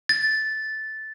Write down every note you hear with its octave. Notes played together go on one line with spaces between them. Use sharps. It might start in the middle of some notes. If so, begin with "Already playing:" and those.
A6